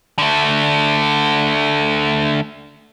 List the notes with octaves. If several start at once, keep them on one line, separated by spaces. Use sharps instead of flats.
D3 A3